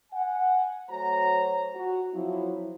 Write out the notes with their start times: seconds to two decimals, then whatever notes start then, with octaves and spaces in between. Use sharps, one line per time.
0.12 F#5 G#5
0.90 F#3 A3 F#4 C5 C#5 A#5
1.75 F#4
2.13 F3 F#3 C4 E4